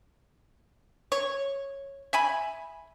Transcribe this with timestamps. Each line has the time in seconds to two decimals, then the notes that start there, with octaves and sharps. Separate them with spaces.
1.12 C#5
2.13 E5 G#5 B5